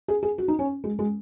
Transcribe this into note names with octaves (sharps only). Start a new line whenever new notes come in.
G#4
G#4
F#4
D#4
C#4
G#3
G#3